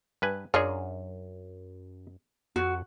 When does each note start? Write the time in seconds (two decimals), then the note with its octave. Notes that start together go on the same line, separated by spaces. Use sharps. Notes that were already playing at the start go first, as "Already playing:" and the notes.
0.22 G2 B4 G#5
0.54 F#2 D4 F4 G#4 A#4 C#5
2.56 F2 F#4